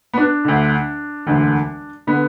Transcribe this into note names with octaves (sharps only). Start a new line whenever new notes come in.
B3
D4
D2 D3
E1 D2 D3
D3 B3